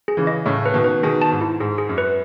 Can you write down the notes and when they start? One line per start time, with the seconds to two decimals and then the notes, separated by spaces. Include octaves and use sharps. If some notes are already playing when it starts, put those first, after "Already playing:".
0.08 G#4
0.17 C#3 E3
0.27 D#5
0.45 A2 C#3 A3
0.66 B4
0.74 B2 D#3
0.84 B4
1.03 B2 D#3 G#4
1.22 A5
1.32 G#2
1.41 E4
1.60 G#2 G#4
1.78 G#4
1.89 F#2
1.98 B4